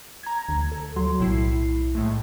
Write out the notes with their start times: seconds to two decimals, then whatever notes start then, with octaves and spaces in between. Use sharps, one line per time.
0.23 A#5 G#6
0.49 D2
0.72 A4
0.96 F#3 C6
1.20 B1 A2 E4 C7
1.95 A2 G#3 A3